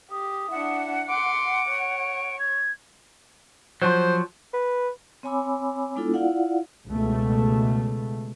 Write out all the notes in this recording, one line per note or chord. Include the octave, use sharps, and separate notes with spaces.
G4 D#6
D4 E4 F#5
C6 D6 D7
C#5
G#6
F3 F#3 C5
B4
C4 C#5 G#5 B5 D6 E6
G#3 B3 D4 E4 F4 A4
E4 F4 D5 F5 F#5
C#2 B2 A3